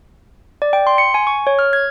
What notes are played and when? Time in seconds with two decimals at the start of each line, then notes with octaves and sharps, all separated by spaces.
0.62 D5
0.73 G5
0.87 C6
0.98 C#7
1.14 G#5
1.27 C#6
1.47 C#5
1.59 F6
1.73 G#6